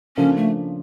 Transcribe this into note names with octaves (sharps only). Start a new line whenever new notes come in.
C#3 F3 A#3 C#4 D4 A4
A3